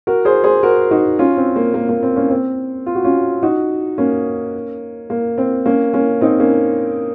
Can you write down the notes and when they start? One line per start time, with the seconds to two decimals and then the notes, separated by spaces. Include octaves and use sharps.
0.07 F#4 A#4
0.25 G#4 C5
0.44 G#4 C5
0.63 F#4 A#4
0.91 D#4 F#4
1.19 C#4 F4
1.37 C4
1.56 A#3
1.74 A#3
1.89 A#3
2.03 C4
2.16 A#3 C#4
2.30 C4
2.86 F4
2.95 F#4
3.04 C#4 F4
3.43 D#4 F#4
3.98 A#3 C#4
5.10 A#3
5.38 C4
5.66 A#3 C#4
5.93 A#3 C#4
6.21 C4 D#4
6.40 A#3 C#4